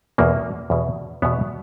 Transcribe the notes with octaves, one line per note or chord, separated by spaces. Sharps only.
E2 B2 A#3
E2 B2
E2 B2 B3